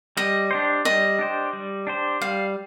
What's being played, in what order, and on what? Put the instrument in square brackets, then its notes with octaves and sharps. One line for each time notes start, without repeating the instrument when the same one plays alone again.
[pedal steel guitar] G3 [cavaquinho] D#5
[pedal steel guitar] D4 G4 C5
[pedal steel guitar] G3 [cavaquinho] D#5
[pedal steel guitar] D4 G4 C5
G3
D4 G4 C5
[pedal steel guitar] G3 [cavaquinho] F5